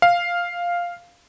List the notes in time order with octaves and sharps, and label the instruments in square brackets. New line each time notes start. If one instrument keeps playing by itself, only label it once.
[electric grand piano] F5